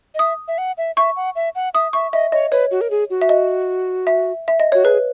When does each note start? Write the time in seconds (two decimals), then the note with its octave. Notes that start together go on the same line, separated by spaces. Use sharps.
0.15 D#5
0.19 E5 D#6
0.48 E5
0.58 F#5
0.78 E5
0.97 E5 C#6
1.16 F#5
1.36 E5
1.55 F#5
1.74 E5 D#6
1.93 E5 C#6
2.13 D#5 E5
2.32 C#5 D#5
2.52 B4 C#5
2.71 F#4
2.81 A#4
2.91 G#4
3.10 F#4
3.22 E5
3.29 D#5
4.07 E5
4.48 E5
4.60 D#5
4.72 F#4 C#5
4.84 G#4 B4